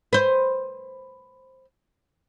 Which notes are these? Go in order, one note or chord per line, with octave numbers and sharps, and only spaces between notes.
B4 C5